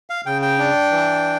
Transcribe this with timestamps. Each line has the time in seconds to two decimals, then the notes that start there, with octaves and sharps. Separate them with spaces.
0.10 F5
0.26 C#3 G5
0.42 G5
0.59 D4
0.91 E3